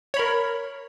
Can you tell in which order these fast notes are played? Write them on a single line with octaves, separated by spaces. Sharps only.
C#5 B5 A#4